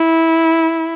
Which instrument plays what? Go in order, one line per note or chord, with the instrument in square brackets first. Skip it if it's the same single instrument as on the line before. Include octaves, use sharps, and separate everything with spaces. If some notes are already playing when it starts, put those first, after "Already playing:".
Already playing: [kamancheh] E4